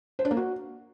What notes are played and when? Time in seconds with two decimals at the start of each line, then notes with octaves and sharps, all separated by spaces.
0.19 C5
0.25 D4
0.31 A#3
0.37 F#4